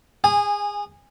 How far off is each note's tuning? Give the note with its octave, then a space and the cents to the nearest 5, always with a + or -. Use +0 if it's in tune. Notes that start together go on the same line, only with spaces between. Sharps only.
G#4 -25 G#5 -10